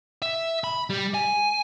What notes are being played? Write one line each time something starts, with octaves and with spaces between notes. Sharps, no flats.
E5
B5
G3
G#5